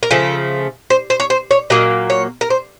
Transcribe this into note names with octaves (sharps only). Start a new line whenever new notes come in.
A#4
C#3 F3 A3 A4
C5
C5
C#5
C5
C#5
A#2 F#3 A#3 D#5
C#5
A#4
C5